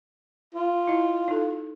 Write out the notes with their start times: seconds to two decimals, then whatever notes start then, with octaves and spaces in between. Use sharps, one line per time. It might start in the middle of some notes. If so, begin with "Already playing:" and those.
0.54 F4
0.87 E4 D#5
1.28 D#4 A4